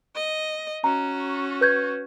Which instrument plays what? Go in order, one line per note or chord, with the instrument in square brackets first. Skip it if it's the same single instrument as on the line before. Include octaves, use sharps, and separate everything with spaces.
[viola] D#5
[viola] C#4 F#4 [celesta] A#5
[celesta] B4 G6 G#6